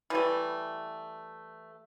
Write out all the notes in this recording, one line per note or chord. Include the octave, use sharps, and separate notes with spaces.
E3 G3 A3